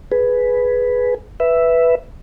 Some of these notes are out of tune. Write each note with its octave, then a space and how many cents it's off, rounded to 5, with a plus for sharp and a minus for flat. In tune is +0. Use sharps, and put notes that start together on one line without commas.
G#4 +10 B4 +0
B4 +0 E5 +5